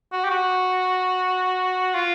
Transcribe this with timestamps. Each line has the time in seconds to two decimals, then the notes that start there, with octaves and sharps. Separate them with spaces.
0.13 F#4
0.25 G4
0.30 F#4
1.95 F4